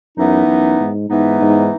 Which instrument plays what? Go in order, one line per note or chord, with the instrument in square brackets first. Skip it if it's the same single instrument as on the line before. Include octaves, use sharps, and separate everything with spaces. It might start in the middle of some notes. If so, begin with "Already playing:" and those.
[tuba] F#2 [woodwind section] E3 B3 D#4
[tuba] F#2
G#2
[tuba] G#2 [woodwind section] E3 B3 D#4
[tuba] G#2